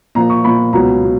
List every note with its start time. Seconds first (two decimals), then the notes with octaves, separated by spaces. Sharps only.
0.15 A#2 F3 A#3 A#5
0.30 C#6
0.44 A#2 F3 A#3 B5
0.73 C#2 B2 F#3 B3 A#5
1.04 B2